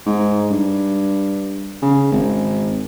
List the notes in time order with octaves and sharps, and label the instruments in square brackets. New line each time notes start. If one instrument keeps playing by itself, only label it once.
[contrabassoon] G#2
G2
C#3
G#1